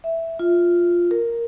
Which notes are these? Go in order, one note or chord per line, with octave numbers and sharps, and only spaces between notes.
E5
F4
A#4